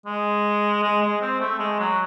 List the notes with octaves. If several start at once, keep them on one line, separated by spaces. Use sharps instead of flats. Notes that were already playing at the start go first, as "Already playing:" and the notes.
G#3
G#3
G#3
C4
A3
G#3
F#3